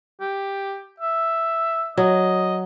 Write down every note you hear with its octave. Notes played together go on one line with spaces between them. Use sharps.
G4
E5
F#3 D#5